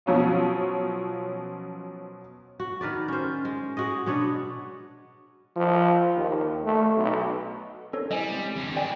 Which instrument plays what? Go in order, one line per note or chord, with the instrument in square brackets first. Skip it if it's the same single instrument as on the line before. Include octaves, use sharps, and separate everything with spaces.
[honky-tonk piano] B2 F3 F#3 C#4 F4
[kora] F#4
D#3 A#4 B4 D5
C#4 C5
G#3
G#3 F#4 G#4 D#5
B2 B3 D4 C#5
[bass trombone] F3
D#2
A3
B1
[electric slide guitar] C#4 A#4 C5 [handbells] A4 C#5
[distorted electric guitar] G3 [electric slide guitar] E4 C5 D5 [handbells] D#5 G#5
[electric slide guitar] G#3 C4 G4
[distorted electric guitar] E2 D3
[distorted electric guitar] D#3 G#3 [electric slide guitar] C4 [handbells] D5 G5 G#5